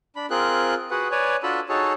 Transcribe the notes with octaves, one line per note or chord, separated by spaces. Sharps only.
D4 B5
C4 F4 G#4 A#4 F#6
F#4 G#4 B4 F#5
B4 C#5 D5 G#5
D4 F4 F#4 A4 A5 B5
D#4 F#4 G#4 A4 C#5 A5